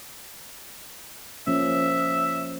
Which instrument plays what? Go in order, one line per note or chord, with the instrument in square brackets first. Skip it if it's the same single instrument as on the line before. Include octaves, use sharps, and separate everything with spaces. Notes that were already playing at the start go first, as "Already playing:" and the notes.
[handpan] F3 A#3 C#4 [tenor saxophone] E5